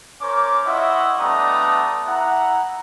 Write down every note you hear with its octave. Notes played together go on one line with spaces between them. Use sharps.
C#4 A#4 C5 C#5 D6
E4 F4 D#5 E5 F#5 C#6
G3 A3 B3 D4 A#5 D#6
E4 F#5 A#5